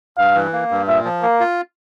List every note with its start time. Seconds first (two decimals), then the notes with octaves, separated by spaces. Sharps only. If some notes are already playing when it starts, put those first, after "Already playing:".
0.18 G2 F5
0.35 E3
0.53 A#3
0.71 G2
0.88 A#2 E5
1.05 F3
1.23 A#3 A#4
1.40 F4